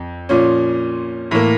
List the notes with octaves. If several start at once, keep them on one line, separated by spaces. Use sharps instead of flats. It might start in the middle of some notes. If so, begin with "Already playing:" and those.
Already playing: F2
A#2 F3 C#4
A2 E3 A#3